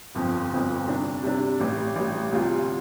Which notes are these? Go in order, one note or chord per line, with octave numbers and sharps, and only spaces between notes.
G1 F2 F3 C4
G1 F2 F3 C4
C3 G3 D4
C3 G3 D4
A1 A2 G3
A1 A2 G3
D2 C3 G3 F4